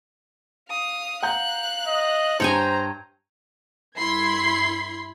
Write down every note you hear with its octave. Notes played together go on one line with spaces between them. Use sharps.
F5 D#6
F5 F#5 A#5 F#6 G6
D#5
G2 C5 C#5 G5 G#5 A#5
G2 E4 B5 C6 G#6 C7